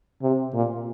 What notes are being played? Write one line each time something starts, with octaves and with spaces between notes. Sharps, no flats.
C3
A#2